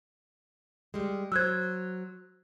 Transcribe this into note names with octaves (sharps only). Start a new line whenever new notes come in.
G3 G#3
F#3 C5 E6 F#6 G#6